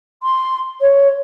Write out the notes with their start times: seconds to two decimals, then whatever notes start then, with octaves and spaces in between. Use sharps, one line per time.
0.22 C6
0.80 C#5